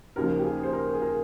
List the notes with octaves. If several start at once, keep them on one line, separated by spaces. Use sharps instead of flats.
D#2 C#3 F3 A#4
G4
G#4
C5
A#4
G#4
A#4